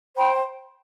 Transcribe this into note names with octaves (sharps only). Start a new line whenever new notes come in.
C5 G5 B5